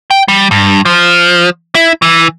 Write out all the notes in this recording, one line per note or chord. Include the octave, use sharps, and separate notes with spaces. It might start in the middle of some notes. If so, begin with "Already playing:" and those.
G5
G3
G2
F3
E4
E3